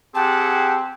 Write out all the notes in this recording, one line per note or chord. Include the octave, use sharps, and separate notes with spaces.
C4 G4 G#4 F#5 A5